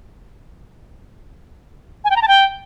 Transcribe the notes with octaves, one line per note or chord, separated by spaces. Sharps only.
G#5
G5
A#5
A5
G5